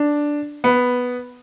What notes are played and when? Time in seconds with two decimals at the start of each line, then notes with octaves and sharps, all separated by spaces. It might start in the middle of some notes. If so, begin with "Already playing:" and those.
Already playing: D4
0.64 B3